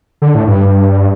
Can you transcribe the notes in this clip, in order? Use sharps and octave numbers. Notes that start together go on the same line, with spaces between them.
D3
A2
G2